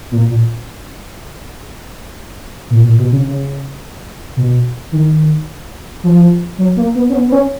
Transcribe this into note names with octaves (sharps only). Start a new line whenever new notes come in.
A#2
A#2
A#2
A#2
B2
C#3
C#3
B2
D#3
F3
F#3
A#3
B3
C#4
B3
B3
C#4